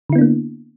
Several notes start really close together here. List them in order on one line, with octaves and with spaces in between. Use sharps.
D3 E4 B3 D4 A#3